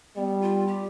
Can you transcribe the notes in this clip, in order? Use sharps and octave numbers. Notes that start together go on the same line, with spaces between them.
G3 B3
F4
G4